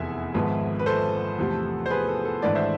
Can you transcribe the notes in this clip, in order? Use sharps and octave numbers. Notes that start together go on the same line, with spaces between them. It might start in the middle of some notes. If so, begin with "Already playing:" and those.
Already playing: F1 E2 E5 G#5
G#1 G#2 F3 B3
B4
A4 C5
E2 C3 F3 A3
C5
G#4 B4
A4
A4
G#1 G#2 E3 A3 D4 B4 D5
C5 E5